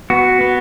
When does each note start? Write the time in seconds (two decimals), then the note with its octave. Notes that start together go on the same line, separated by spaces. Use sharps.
0.10 B3 F#4
0.41 B3